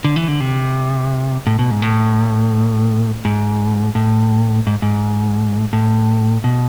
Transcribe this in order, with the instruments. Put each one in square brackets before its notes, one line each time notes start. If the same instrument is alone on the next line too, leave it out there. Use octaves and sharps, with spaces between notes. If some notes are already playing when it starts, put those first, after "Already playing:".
[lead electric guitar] D3
E3
D3
C3
A2
B2
G#2
A2
G#2
A2
G#2
G#2
A2
B2